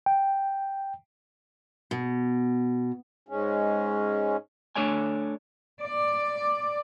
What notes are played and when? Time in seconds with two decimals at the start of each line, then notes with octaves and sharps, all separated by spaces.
0.06 G5
1.91 B2
3.29 G#2 G#3 C#4
4.76 A3 D4 A4 C#5 D5 G#5
5.82 D5